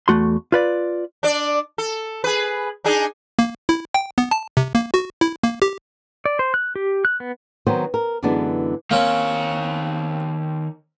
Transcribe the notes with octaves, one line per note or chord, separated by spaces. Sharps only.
E2 A3 F#4 C6
F4 B4 D5
D4 D5
A4
G#4 B4
D4 D#4 G#4
A#3
E4
G5
B3
A5
C3
A#3
F#4
E4
A#3
G4
D5
C5
F#6
G4
F#6
B3
D#3 F#3 B3 C4 C5
A#4
F#2 D3 E3 G#3 B3 D4
D#3 A#3 C4 C#4 C#5